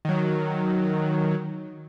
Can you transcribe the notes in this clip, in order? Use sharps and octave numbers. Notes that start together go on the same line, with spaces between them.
D#3 F#3